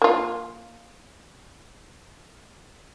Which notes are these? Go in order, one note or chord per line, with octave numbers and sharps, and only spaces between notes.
A#3 F4